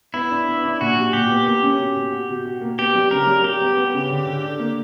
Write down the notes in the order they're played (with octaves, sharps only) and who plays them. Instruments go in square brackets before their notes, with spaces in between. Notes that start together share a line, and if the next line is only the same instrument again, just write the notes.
[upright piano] B3 [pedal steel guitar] E4
[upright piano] D4
B3
D4
[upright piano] A#2 [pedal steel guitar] F#4
[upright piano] G3
[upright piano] A#2 [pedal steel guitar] G4
[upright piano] B3
A#3
C#4
B2
B2
F#4
B2
F#4
A#3
[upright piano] B3 [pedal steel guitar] G4
[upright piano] G3
[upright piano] C#3 [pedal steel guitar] A#4
[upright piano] G3
[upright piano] G3 [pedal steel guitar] G4
[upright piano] B3
B3
C#3
D3
D3
D4
A#3